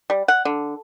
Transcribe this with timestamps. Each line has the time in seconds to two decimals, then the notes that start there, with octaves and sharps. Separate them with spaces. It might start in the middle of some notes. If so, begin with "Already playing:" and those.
0.10 G3
0.28 F#5
0.45 D3